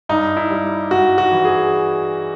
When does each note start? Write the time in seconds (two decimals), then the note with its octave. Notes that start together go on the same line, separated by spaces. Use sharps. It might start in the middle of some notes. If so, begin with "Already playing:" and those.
0.09 G2 D#4
0.37 E4
0.50 G3
0.91 G2 F#4
1.18 F#4
1.32 E3
1.45 G#4